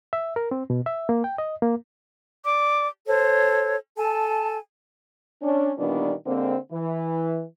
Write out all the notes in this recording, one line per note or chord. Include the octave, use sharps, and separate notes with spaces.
E5
A#4
C4
B2
E5
A#3
G5
D#5
A#3
D5 D6
A4 C5 C#5
A4 G#5 A5
C#4 D4
A#2 D#3 E3 G3 B3 D4
D3 G#3 A#3 C4
E3